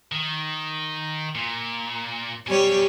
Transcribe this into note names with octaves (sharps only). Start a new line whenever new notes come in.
D#3
A#2
B2 G3 G4 C#5 G#5